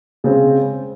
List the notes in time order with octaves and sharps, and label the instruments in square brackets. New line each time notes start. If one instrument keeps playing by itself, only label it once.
[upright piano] C#3 G#3 C4